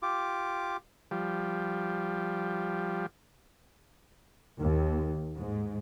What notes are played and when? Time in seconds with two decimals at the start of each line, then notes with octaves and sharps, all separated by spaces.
0.02 F4 G4 D6
1.11 F3 G3
4.60 D#2
5.37 G#2